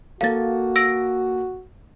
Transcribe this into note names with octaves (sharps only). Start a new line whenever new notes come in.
A#3 F#4 A4 F5 A6
E6 A#6 D7